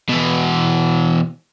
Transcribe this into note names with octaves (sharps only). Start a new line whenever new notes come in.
B2 E3